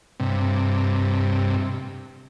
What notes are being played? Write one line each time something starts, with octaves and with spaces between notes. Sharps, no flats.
G2 C3